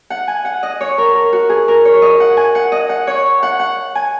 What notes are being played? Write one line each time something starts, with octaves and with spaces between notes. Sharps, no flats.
F#5
G#5
F#5
D#5
C#5
A#4
A#4
F#4
G#4
A#4
C#5
D#5
F#5
G#5
F#5
D#5
F#5
C#5
F#5
F#5
G#5